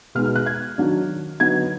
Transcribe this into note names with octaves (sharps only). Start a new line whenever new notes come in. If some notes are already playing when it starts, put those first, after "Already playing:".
B2 G#3 D#4 F6
F6
F#6
G#6
D#3 F#3 D4
D3 F#3 B3 D#4 G#6